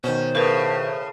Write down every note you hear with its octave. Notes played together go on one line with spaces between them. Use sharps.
B2 D#3 C#4 C5
A2 C#3 A#4 B4